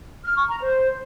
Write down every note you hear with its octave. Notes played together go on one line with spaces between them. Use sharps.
F6
C#6
A#5
C5